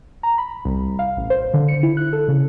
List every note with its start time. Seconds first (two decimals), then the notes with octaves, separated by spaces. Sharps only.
0.23 A#5
0.38 B5
0.65 C2
0.99 F5
1.17 A1
1.30 C5
1.54 D3
1.68 C#7
1.83 E4
1.97 F#6
2.13 A4
2.28 C#3